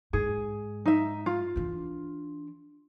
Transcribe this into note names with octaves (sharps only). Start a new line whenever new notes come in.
G#2 G#4
D#4 E5
F4
E3 D4